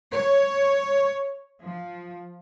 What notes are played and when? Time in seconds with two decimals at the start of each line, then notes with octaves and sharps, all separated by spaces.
0.12 C#5
1.63 F3